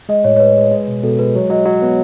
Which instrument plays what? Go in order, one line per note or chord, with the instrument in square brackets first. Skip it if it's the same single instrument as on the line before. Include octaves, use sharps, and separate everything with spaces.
[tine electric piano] G#3 [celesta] D#5
[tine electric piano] A2 [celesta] C#5
[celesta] C#5
[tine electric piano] G#3 [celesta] B4
[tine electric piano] G#3
G#3
B2
[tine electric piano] B2 [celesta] A4
[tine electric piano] G#3 [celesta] B4
[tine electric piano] F#3 [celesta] C#5
[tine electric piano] F#3 [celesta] D#5
[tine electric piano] F#3
B3